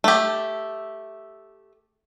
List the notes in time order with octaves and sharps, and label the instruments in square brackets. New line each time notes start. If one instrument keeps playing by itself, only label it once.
[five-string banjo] A3 G4